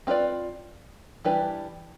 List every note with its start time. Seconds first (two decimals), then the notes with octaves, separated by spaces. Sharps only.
0.07 C4 F4 B4 D5
1.25 E3 G3 D4 G4 B4